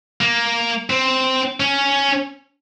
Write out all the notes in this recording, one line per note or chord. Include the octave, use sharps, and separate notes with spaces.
A#3
C4
C#4